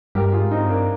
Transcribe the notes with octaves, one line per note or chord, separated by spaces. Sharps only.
G2 G4 A#4
F4 G#4
G#2
C4 D#4
G2
A#3 D4